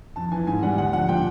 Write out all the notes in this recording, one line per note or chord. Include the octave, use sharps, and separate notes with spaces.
F2 A5
E3 G#5
G#2 G#5
G3 F#5
D2 F#5
F3 F#5
A#2 G5